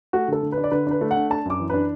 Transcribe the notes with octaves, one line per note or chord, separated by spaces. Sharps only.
A3 F#4
D3 A4
D3
B4
D4
D5
D3 B4
D4 B4
A3
F#5
D4
D4 A5
F#2 D6
E3
D4 B4